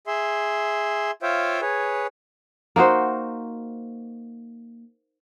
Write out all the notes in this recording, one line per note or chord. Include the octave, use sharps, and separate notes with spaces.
G#4 E5 C6
F4 C5 C#5 E5 F5 G5
G#4 B4 C#5
A#3 D#4 F#4 C5